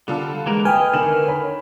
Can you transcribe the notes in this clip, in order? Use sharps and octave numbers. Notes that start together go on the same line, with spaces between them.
D3 G3 F4 A4
E3 G#3 A#3 A#4
B4 D#5 G5 G#5 B5 F6
D3 D#3 A#4 E7 F#7
C#5 B5